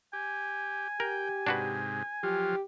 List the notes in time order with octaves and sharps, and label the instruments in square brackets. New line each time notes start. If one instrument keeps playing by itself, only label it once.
[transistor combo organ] G4 [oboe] G#5
[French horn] G4 [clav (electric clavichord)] A#4 [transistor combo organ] G5
[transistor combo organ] G#2 C3 [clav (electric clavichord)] D4 F#4 B4
[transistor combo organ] F3 F#3 F4 [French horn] G4